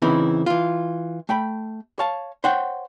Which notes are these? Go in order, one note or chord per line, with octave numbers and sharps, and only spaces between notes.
C#3 E3 C4 D#4 E4
E3 F4
A3 G5 B5
C#5 F5 A5
C5 C#5 F#5 G5